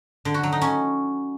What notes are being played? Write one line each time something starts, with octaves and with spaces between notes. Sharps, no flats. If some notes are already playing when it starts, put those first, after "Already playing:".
D3
F#4
F#3
D#4
C#4